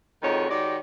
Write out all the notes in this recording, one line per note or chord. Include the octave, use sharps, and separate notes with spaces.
F2 D#3 G#3 F#4 G#4 C#5
D#3 G#3 F#4 G4 C#5 D5